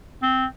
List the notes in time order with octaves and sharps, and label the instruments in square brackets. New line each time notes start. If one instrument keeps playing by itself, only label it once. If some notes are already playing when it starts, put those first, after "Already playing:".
[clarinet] C4